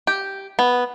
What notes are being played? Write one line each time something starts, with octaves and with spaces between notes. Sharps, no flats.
G4
B3